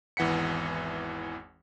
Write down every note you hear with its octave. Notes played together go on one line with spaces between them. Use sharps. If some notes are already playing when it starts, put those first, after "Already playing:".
G#1 E2 E3 F#5 B6 C#7